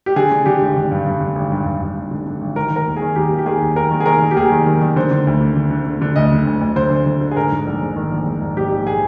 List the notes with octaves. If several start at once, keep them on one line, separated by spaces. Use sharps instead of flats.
G4
D3 G#4
D3
D3 G4
G#1
D3
G2
G2
D3
G#1
G2
G2
G2
G#1
D3
D3
G#1
D#3 A#4
D#3
A#4
D#2
G#4
D#3
D#2 G4
D#3
G4
D#3 G#4
D#2
D#2 A#4
D#3
G#4
D#3 A#4
D#3
G4
D#2 G#4
D#3
D#3
D#3
D3 C5
D3
D2
D3
D3
D3
D3
D3
D2 D#5
D3
D2
D2
D3 C5
D3
D3
D3
G#4
G#2 A#4
G#2
A#1
G#2
D#3
A#1
G#2
A#1
G#2 G4
A#1
G#4